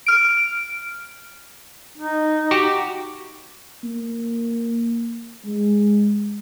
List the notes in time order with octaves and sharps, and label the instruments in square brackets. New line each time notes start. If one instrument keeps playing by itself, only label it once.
[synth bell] F6 D7
[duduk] D#4
[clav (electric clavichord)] F#4 G4
[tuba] A#3
G#3